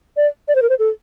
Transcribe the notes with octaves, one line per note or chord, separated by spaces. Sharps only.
D5
D5
C5
A#4
C5
A4